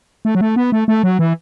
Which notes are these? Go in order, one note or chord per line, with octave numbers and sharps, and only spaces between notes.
A3
F#3
A3
B3
A3
A3
F#3
E3